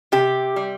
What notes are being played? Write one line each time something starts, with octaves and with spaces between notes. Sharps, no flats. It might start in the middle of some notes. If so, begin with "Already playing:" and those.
C3 G4
G3